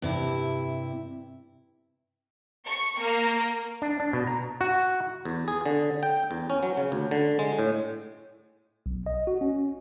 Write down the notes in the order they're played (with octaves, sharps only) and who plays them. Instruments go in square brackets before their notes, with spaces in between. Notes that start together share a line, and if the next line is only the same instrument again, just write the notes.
[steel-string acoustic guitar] G2 C3 E4
[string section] C#6
A#3
[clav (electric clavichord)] D4
D4
B2
A#5
F#4
E2
G#4
D3
G5
E2
C#4
F#3
C#3
D2
D3
G#3
A2
[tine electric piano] B1
D#5
F#4
C#4